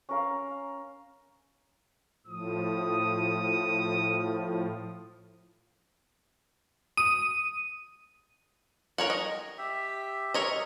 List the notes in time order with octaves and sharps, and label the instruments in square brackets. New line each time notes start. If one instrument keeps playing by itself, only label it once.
[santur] C#4 A#4 F5
[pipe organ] A2 F3 [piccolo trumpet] D#6
[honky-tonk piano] D#6 [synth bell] D#7
[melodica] G3 [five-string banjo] A#4 C#5 F#5
[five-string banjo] D#5
[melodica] G4 E5
[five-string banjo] A#4 C#5 D#5